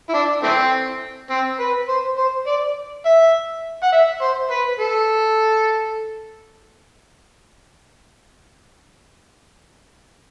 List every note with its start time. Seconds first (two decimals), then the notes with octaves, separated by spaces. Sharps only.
0.09 E4
0.14 D4
0.43 E3 A3 C4
1.30 C4
1.60 B4
1.89 C5
2.18 C5
2.47 D5
3.05 E5
3.83 F#5
3.93 E5
4.22 C5
4.51 B4
4.80 A4